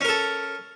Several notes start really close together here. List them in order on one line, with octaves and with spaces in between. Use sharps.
C#4 A#4 A4